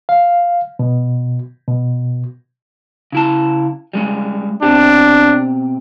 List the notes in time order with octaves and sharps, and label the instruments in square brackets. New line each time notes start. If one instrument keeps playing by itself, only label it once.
[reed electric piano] F5
B2
B2
[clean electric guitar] C#3 E4 A5
G3 G#3 C#4
[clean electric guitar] B2 C4 G4 [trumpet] D4